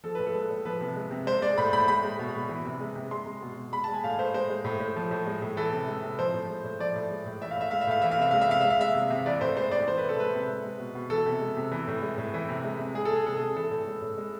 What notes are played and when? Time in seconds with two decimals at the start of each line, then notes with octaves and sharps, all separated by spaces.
0.04 F3 A4
0.15 A2 B4
0.27 A4
0.34 G#3
0.50 A2
0.65 F3 B4
0.81 C3
0.96 G#3
1.11 C3
1.27 G#3 C5
1.41 G#3 D5
1.58 A2 B5
1.73 A2 B5
1.88 G#3 B5
2.04 G#3
2.19 B2
2.34 B2
2.49 E3
2.65 C3
2.80 G#3
2.96 C3
3.11 G#3 C6
3.26 G#3
3.42 B2
3.58 B2
3.73 G#3 B5
3.84 G#3 A5
3.94 G#5
4.04 A2 F5
4.18 A2 C5
4.34 G#3 C5
4.50 G#3
4.65 A2
4.80 A2
4.96 F3
5.11 A2
5.26 G#3
5.42 A2
5.57 E3 A4
5.72 C3
5.88 G#3
6.03 C3
6.19 F3 C5
6.34 A2
6.49 G#3
6.64 A2
6.80 F3 D5
6.95 A2
7.10 G#3
7.26 A2
7.41 E3 E5
7.51 F5
7.57 A2 E5
7.71 G#3 F5
7.81 E5
7.87 A2 F5
8.02 E3 E5
8.11 F5
8.18 C3 E5
8.31 G#3 F5
8.41 E5
8.49 C3 F5
8.61 G#3 E5
8.70 F5
8.79 G#3 E5
8.95 C3
9.10 C3
9.26 E3 D5
9.41 A2 C5
9.57 G#3 C5
9.71 A2 D5
9.87 E3 C5
9.98 C3 B4
10.09 A4
10.19 G#3 B4
10.34 C3
10.49 G#3
10.64 G#3
10.80 B2
10.95 B2
11.10 E3 A4
11.26 C3
11.41 G#3
11.57 C3
11.72 E3
11.88 A2
12.02 G#3
12.18 A2
12.34 E3
12.49 C3
12.64 G#3
12.79 C3
12.95 G#3 G#4
13.05 G#3 A4
13.16 G#4
13.26 C3 A4
13.37 C3 G#4
13.56 E3 A4
13.71 A2
13.87 G#3
14.02 A2
14.18 G#3